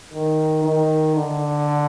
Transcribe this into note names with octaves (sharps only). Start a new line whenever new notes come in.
D#3
D#3
D3